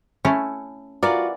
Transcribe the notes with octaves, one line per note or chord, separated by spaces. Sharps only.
A3 C#4 E4
E3 F4 F#4 A#4 D5